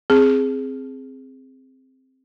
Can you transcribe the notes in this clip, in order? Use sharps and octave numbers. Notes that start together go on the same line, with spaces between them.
C4 G#4